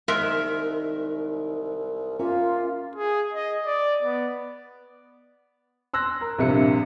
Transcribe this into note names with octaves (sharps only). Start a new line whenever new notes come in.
C2 D#3 G#3 A#3 A#4 E5
A#3 C#4 F4 E5
G#4
D#5
D5
B3
C6 E6 F#6 A#6
A#4
A#1 G2 C3 C#7